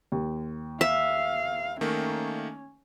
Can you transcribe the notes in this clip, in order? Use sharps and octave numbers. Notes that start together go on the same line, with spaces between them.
D#2
E5 F5
D#3 A3 A#3 C#4